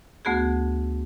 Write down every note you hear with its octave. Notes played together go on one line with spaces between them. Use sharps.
D2 A3 B3 F#4 G#4